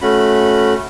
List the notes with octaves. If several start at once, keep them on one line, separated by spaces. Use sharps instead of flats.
A3 C#4 F#4 B5